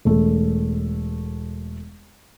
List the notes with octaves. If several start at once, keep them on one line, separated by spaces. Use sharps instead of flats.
E1 A3